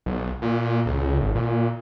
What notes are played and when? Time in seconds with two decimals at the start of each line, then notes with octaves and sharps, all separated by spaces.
0.06 B1
0.42 A#2
0.86 C#2
1.21 G#1
1.35 A#2